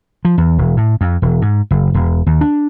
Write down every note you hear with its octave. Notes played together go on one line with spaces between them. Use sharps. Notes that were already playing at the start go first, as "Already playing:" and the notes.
F3
E2
E1
A2
F2
E1
G#2
F#1
E1
D#2
D4